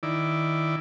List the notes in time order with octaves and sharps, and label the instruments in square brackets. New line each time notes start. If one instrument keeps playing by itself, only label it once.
[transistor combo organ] D#3 E4 D5